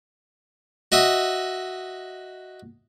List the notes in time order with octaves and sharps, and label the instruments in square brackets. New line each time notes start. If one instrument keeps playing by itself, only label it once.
[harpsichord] F#4 D#5 E5 D#6